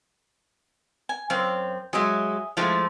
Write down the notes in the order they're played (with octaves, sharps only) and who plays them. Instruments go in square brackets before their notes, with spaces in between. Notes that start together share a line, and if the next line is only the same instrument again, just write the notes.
[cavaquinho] G#5
[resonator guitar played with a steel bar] F#2 C4 [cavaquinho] C#5 F5
[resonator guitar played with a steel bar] F#3 G#3 [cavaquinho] G#4 D#5 E5
[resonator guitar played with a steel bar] F3 G#3 A3 [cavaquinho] E4 F#4 F5